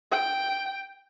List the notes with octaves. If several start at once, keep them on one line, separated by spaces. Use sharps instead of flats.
G5